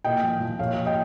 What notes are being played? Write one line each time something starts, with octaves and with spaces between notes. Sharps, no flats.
A#2 D#5 G5
F3
F3
A#2 C#5 F5
A#2
D#5 G5